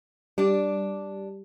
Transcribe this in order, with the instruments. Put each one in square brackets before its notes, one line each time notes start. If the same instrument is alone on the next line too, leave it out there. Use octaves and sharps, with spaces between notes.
[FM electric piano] G3 [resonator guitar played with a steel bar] D4 D5